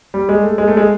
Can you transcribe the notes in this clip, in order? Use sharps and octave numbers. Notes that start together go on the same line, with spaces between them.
G3
G#3
A3
G#3
A3
G#3